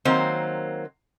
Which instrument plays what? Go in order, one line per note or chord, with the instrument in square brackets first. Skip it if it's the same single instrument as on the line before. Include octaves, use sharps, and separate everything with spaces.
[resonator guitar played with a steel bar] D#3 F#3 A#3 C4 C5